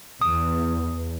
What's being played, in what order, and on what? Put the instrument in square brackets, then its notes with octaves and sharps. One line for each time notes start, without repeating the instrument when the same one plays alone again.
[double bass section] E2 [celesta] D#6